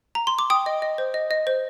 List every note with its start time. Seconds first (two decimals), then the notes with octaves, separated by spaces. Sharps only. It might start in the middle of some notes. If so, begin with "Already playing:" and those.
0.15 A#5
0.27 C6
0.39 D6
0.50 G5 D#6
0.66 D#5
0.82 D#5
0.98 C5
1.14 D#5
1.31 D#5
1.47 C5